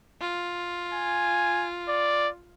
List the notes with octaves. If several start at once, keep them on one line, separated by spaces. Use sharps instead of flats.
F4
G#5
D5